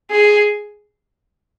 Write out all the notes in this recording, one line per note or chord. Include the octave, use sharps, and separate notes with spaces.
G#4